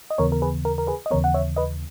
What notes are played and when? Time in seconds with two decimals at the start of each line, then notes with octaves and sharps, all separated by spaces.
0.10 D#5
0.18 D#2 C#3 E3 B3 A#4 C#5
0.32 A#4
0.42 G#4 B4
0.65 A#4
0.78 A#4
0.87 G#4 B4
1.06 D#5
1.11 D#2 C#3 E3 B3 A#4 C#5
1.24 F#5
1.34 C#5 E5
1.56 B4 D#5